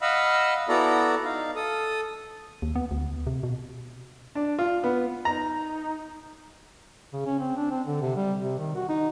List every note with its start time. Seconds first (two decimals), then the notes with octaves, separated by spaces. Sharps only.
0.02 D#5 F5 F#5 B5 E6
0.69 B3 E4 F#4 A4 D5 A#5
1.25 D#4 F5
1.56 A4 D#6
2.62 D#2
2.75 B3
2.91 D2
3.27 C3
3.43 B2
4.35 D4
4.59 F4
4.84 B3
5.25 D#4 A#5
7.13 C#3
7.26 C#4
7.40 C4
7.57 D4
7.71 C4
7.86 D3
8.01 C3
8.17 G3
8.43 C3
8.59 D#3
8.76 F#4
8.89 D#4